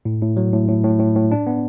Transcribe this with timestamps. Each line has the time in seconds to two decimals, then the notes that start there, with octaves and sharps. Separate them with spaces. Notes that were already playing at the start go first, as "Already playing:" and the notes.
0.05 A2
0.22 A2
0.37 F#3
0.52 A2
0.68 A2
0.84 A2
0.99 A2
1.15 A2
1.31 D4
1.47 B3